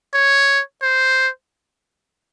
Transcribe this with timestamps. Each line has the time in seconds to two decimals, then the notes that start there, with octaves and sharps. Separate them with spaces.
0.14 C#5
0.82 C5